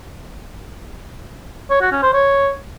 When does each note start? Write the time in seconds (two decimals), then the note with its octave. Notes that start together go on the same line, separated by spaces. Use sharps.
1.70 C#5
1.81 F#4
1.92 C#4
2.03 C5
2.13 C#5